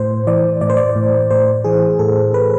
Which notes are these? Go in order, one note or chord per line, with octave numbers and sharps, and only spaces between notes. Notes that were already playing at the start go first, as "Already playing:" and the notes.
Already playing: A2 C5
E3 D5
A2 D5
C5
D5
A2
A2 C5
E3 G#4
A2 A4
A2 B4